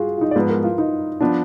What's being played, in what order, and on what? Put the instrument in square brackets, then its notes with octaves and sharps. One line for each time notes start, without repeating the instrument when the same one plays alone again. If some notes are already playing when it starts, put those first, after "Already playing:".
Already playing: [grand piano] F4 F#4 G#4
F4
D#4
D5
[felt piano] G#2 F3 B3 [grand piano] B4
[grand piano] A#4
F4
D#4
[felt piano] F3 B3 [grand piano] D4